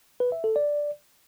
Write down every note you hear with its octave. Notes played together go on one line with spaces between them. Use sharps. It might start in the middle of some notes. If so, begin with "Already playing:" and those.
B4
E5
A4
D5